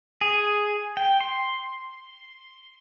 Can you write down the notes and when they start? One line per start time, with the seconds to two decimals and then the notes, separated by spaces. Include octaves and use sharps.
0.21 G#4
0.97 G5
1.20 C6